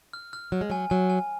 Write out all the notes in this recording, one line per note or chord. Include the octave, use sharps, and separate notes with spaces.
F6
F6
F#3 F6
G#3
F#3 G#5
F#3 G#5
G#5